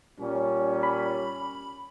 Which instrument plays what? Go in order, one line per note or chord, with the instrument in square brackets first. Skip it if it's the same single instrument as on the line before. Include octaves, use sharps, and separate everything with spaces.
[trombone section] A#2 G3 C#4
[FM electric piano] B5